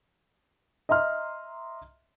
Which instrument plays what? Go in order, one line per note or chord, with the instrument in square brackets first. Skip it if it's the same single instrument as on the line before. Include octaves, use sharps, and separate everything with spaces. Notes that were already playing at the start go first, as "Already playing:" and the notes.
[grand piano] D#5 E5 A#5 C6 F6